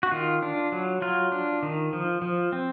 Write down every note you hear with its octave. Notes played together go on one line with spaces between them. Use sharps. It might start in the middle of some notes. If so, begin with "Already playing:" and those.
F#4
D#3 F4
D4
F#3
F#3 F4
D4
D#3
F3
F3
C4